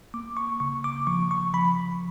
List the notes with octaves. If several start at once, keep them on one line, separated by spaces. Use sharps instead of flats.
A#3 D6
C#6
C#3 C#6
D6
F3 C#6
C#6
F3 B5